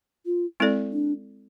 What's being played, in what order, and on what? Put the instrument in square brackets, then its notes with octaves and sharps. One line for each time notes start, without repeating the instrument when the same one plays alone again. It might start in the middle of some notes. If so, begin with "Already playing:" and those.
[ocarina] F4
[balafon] G#3 C4 E4 A4 D5
[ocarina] D4